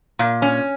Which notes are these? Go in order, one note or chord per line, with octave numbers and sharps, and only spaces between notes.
A#2
C#4